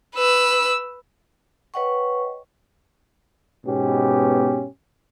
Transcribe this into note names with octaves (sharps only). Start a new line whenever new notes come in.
B4 E6
B4 C#5 D#5 F#5 G5 C#6
G#2 B2 B3 C#4 G4